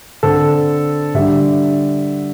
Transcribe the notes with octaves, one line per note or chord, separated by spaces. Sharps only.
D3 C4 A4
D3 G3 D4 E5